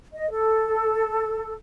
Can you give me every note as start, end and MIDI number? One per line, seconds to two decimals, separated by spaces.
0.13 0.29 75
0.30 1.53 69